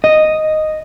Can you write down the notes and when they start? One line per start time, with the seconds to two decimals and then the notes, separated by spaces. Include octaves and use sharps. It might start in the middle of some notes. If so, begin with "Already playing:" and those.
0.04 D#5